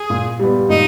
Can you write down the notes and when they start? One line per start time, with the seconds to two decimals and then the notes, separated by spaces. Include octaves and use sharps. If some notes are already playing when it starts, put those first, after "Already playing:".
Already playing: G#4
0.10 A#2
0.39 G3 B3
0.69 A#2 D#4